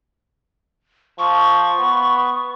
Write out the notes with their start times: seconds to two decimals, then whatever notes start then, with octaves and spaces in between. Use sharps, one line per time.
1.19 F3 C#6
1.79 B3